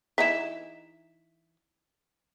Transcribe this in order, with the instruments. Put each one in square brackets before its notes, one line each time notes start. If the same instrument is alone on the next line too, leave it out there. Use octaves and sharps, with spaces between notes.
[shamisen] E3 D#4 E4 [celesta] B6 E7